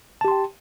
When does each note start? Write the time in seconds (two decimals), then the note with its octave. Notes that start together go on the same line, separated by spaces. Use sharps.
0.21 A5
0.25 G4
0.28 C6
0.31 G5